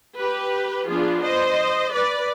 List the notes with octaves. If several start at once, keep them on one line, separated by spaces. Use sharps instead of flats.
G4 B4
F3 B3 D4 F4 G#4
C5 D#5
B4 D5